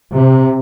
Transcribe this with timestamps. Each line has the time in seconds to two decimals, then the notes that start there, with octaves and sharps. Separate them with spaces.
0.14 C3